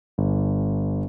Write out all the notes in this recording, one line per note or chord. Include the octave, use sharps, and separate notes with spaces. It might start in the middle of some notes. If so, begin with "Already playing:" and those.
G1